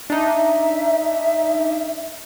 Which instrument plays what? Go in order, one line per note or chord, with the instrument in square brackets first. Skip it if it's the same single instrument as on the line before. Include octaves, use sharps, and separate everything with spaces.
[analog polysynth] D4 D#4 [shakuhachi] E5